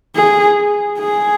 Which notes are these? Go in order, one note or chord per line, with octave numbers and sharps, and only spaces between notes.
G#4
G#4